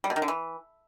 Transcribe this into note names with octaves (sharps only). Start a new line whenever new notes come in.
G3
B2
D#3
D3
E3